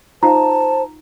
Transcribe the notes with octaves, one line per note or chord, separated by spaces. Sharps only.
D#4 F4 C5 A5 A#5